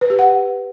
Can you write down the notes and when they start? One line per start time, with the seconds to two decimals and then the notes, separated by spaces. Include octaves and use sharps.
0.01 B4
0.10 G4
0.19 F#5